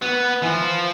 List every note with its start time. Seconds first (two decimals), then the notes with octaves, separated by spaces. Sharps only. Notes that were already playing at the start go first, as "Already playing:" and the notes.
0.02 B3
0.42 E3
0.45 F3